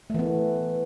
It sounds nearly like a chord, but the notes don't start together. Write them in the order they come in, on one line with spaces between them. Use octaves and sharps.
A3 E3 B3